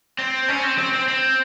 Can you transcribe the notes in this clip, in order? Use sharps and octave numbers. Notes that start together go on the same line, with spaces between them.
C4
C#4
C4
C4
C4
C4